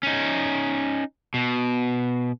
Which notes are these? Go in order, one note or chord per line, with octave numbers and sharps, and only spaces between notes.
C#4 D#4
B2